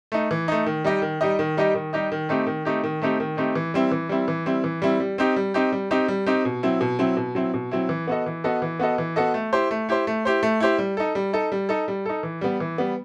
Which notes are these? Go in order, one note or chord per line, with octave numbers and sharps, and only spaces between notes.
A3 D#4
E3
A3 D#4
D#3
G3 D#4 G4 D#5
D#3
G3 D#4 G4 D#5
D#3
G3 D#4 G4 D#5
D#3
G3 D#4 G4 D#5
D#3
A3 C4 D#4 G4
D#3
A3 C4 D#4 G4
D#3
A3 C4 D#4 G4
D#3
A3 C4 D#4 G4
E3
G3 C4 E4
E3
G3 C4 E4
E3
G3 C4 E4
E3
G3 C4 E4
G3
C4 D#4 G4
G3
C4 D#4 G4
G3
C4 D#4 G4
G3
C4 D#4 G4
B2
F#3 C4 E4
B2
F#3 C4 E4
B2
F#3 C4 E4
B2
F#3 C4 E4
E3
B3 F#4 A4 D#5
E3
B3 F#4 A4 D#5
E3
B3 F#4 A4 D#5
E3
B3 F#4 A4 D#5
A3
E4 G4 C5
A3
E4 G4 C5
A3
E4 G4 C5
A3
E4 G4 C5
G3
D#4 A4
G3
D#4 A4
G3
D#4 A4
G3
D#4 A4
E3
G3 B3
E3
G3 B3